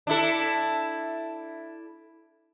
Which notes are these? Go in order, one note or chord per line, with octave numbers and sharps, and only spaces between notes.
D4 E4 A4